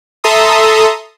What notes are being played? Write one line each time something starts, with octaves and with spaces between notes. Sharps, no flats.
A4 E5 A#5 C6 D#6